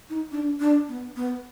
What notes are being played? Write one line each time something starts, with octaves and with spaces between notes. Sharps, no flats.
D#4
D4
D4
B3
B3